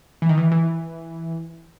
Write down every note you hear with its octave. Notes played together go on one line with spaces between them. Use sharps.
E3
D#3
E3
E3